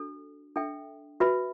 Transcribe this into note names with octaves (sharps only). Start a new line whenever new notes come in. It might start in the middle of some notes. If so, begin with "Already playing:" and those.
Already playing: D4 F#4 A4
D4 A4 E5 G5
F#4 B4 E5 B5